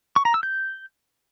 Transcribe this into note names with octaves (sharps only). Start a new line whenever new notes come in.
C#6
A#5
E6
G6